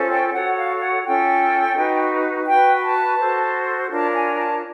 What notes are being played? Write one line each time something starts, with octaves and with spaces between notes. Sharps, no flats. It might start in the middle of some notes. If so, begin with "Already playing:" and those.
Already playing: C#4 F4 A4 C5
G5
F#4 A4 C#5 F#5
F5
F#5
C#4 F4 A4 G5
D#4 F#4 B4
F#4 B4 G5
A5
F#4 A4 C5
D4 F4 A#4 C#5 A5
G#5
A5